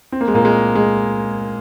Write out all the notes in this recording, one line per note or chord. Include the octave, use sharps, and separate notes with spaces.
C4
A#3
G#3
A#2 A#3
G#3
G#3